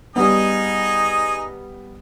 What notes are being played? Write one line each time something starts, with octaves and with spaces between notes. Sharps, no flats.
G3 B3 D#4 G#4 D#5